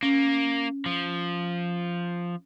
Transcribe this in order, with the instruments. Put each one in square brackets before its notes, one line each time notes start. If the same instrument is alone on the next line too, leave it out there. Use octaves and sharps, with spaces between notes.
[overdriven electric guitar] A#3 [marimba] C#4
[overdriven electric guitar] F3